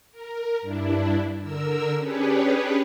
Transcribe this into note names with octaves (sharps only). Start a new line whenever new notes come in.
A#4
G2 D4 E4
D3 A#4 E6
C#4 D4 G4 G#4 B4 C#5